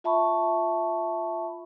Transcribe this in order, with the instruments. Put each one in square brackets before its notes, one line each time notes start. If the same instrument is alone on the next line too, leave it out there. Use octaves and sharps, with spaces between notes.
[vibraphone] F4 E5 A5 B5 C#6